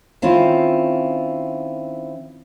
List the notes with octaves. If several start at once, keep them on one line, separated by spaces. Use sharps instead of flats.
D#3 C4 C#4 E4 F4